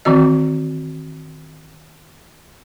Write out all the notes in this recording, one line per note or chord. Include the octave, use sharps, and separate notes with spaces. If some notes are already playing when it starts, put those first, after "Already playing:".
D#3 E3 C4 F#4 D#5